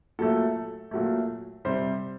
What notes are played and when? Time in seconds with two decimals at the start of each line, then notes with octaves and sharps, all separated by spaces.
0.19 A#2 F#3 A3 A4
0.91 A#2 F#3 A3
1.65 C3 G3 C5